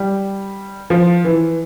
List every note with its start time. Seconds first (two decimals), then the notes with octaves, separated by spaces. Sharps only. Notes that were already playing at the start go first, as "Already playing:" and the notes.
Already playing: G3
0.90 F3
1.24 E3